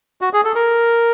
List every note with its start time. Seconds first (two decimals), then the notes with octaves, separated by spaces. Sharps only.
0.21 F#4
0.33 G#4
0.44 A4
0.55 A#4